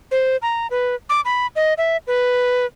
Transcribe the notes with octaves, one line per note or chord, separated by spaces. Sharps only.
C5
A#5
B4
D6
B5
D#5
E5
B4